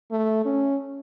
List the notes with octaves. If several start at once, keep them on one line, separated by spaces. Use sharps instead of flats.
A3
C#4